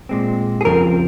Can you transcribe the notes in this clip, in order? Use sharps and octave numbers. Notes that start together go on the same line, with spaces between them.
A#2 G#3 C4
G#4
F2 C#3 F3 C4 A#4